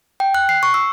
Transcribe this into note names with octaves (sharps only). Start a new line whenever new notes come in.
G5
F#6
C7
C#6
E6